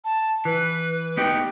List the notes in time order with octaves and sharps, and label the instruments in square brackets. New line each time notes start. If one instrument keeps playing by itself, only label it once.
[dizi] A5
[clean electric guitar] E3 [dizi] B4
[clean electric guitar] B3 D#4 G4